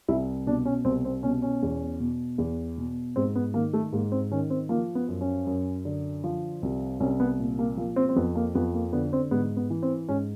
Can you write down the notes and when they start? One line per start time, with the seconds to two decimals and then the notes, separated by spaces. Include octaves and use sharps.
0.08 C2 E4
0.47 B2 D4
0.65 C#4
0.84 C2 C4
1.05 C4
1.23 B2 C#4
1.42 C#4
1.63 E2
2.00 B2
2.38 E2
2.78 B2
3.16 G#2 C4
3.35 B3
3.54 D#3 A#3
3.73 A3
3.93 G#2 A#3
4.12 C4
4.31 D#3 C#4
4.50 C4
4.69 F3 A#3
4.95 B3
5.08 F#2
5.21 C#4
5.47 F#2
5.85 D3
6.24 F3
6.63 C2
7.00 C2 C#4
7.20 B3
7.39 A#2
7.59 A#3
7.77 F3 A#3
7.96 C4
8.09 C4
8.16 F2 B3
8.35 A#3
8.55 F2 B3
8.73 A#3
8.93 D3 B3
9.13 C4
9.31 G#2 B3
9.57 B3
9.70 E3
9.83 C4
10.09 G#2 C#4